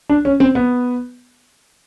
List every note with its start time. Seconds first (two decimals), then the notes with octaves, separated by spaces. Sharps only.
0.09 D4
0.25 C#4
0.40 C4
0.55 B3